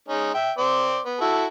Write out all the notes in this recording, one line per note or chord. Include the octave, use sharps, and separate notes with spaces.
G#3 C#4 D#4
E5 G5
C4 D5 C6
B3
E4 F#4 A4